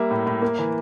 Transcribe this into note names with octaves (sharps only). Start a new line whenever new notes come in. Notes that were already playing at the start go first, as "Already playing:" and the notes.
Already playing: G3 A#3 E5
A2
A2
A#3
E3